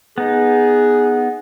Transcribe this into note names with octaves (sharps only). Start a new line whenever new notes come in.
B3 D#4 G#4